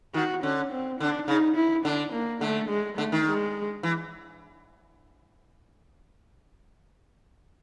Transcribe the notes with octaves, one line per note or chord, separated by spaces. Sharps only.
D#3 F#4
D3 C#4
C4
D3 D4
C#3 D#4
E4
D3 D4
A#3
D3 A3
G#3
D3 A3
D#3
G#3
E3